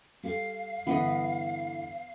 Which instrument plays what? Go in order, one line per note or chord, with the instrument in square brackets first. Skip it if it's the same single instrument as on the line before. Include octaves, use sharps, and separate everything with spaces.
[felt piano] G3 A4 [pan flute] F5
[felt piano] G2 D3 E3 [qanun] B3 B4 D#5